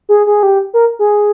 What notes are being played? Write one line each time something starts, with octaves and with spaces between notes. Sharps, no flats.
G#4
G#4
G4
A#4
G#4